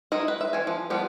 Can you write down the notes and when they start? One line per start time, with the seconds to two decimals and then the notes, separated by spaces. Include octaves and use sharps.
0.12 D#4 E4 D#5
0.28 B4
0.41 E5
0.53 E3 G#5
0.67 F3
0.90 F3 G3 B3